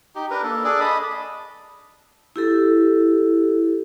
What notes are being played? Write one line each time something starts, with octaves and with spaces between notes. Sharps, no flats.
D#4 G4
D4 A#4 B4
A#3 A4
D4 G#4 A4 D5
D#5 A5 B5
E4 G4 A4